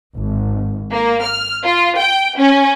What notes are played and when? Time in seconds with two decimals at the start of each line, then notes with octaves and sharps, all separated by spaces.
0.16 G#1
0.92 A#3
1.22 F6
1.65 F4
1.99 G5
2.39 C#4